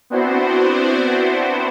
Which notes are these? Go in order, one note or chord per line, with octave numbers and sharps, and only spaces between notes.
B3 C4 D4 E4 F#4 C5